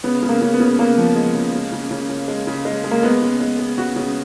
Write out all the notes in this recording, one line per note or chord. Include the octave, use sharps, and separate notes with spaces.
C#3 B3
C#3
A#3
C#3
B3
C#3
C#3 A#3
F3
G#3
C#3
G#3
C#3
C#3
C#3
G#3
C#3
G#3
G#3
A#3
G#3 B3
C#3
G#3
G#3
C#3 F#4
C#3